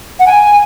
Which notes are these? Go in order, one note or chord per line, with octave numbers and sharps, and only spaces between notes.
F#5
G#5